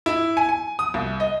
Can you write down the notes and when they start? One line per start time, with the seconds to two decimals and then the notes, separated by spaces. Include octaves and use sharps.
0.06 E4
0.37 G#5
0.49 G#5
0.79 D#6
0.94 C2
1.20 D#5